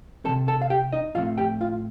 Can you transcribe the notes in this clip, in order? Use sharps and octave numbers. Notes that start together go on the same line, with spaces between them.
C3 F3 C4 A4 A5
A4 A5
F5
G4 G5
D#4 D#5
A2 F3 A3 C4 F4 F5
G4 G5
F4 F5